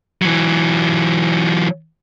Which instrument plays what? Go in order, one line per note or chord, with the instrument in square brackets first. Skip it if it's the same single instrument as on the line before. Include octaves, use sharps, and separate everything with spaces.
[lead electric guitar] E3 F#3